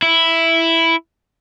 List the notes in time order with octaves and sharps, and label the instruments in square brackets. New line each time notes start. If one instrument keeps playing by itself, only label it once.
[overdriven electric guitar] E4